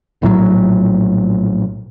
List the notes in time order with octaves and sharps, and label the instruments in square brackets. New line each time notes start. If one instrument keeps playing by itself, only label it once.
[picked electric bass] A#1 A2 F3 F#3